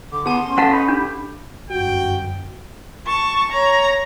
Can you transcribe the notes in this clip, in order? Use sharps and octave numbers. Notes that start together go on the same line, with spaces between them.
D3 D6
B3 G#4 A5 C6
C#4
F#4 A4 B4 F5 F#5 A5
D#4 B4 B5
D4 G4 G6
G1 F#2 F#4 G5
A5 C#6
C#5 A#5